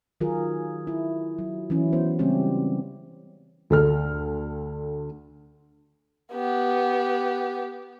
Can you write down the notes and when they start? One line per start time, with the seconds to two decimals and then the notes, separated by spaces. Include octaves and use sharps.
0.21 D#3 F#3 F4 G#4 A#4
0.87 E4
1.38 F#3
1.70 E3 F#3 C#4 E4
1.93 B3 C5
2.19 C#3 G3 G#3 C4 C#4 G4
3.70 D2 A4 F6
6.33 B3 G4